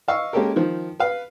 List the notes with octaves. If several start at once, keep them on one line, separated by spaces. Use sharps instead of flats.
D#5 F5 C#6 E6
G#3 A#3 C#4 G4 A4 A#4
D#3 F3
B4 F5